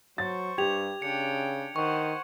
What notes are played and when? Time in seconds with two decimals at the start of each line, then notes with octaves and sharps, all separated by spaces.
0.18 F#3 C5 C#6 A6
0.58 G2 G4 G#6 F7
1.02 C#3 D4 G5 C#7
1.76 D#3 C5 F#5 C#6